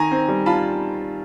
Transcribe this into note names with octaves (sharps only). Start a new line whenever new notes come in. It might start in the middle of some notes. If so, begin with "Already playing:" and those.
Already playing: D#3 G#5 A#5
C4
G3
F4 A5 B5